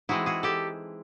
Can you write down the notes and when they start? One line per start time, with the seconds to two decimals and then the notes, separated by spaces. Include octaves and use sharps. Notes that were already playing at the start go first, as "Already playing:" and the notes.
0.09 E3 G#3 C4 D#4 E4 F#4
0.26 F#4 G#4
0.43 G4 A4